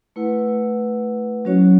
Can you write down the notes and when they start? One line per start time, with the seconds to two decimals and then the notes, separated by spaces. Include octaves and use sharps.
0.16 A3 E4 B4 F#5
1.45 F#3 C#4 F#4 C#5